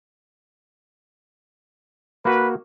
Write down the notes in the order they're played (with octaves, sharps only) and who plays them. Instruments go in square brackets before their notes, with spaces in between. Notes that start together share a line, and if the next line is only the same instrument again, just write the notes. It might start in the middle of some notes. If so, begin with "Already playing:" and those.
[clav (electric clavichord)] A#3 F#4 [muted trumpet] B4